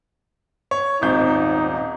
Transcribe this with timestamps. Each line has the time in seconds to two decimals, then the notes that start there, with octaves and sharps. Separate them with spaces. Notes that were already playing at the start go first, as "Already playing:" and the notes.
0.71 C#5
1.02 D#1 G#1 D#4 G6